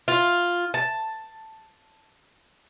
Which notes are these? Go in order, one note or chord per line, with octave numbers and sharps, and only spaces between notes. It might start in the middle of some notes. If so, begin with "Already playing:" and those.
F4
A5